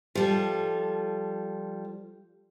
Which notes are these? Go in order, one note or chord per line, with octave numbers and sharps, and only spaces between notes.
F3 G3 A4